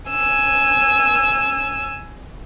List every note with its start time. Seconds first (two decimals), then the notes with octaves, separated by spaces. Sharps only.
0.11 G#5 E6